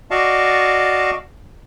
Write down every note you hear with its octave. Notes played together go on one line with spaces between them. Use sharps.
F#4 D5 D#5 F5 A5 C#6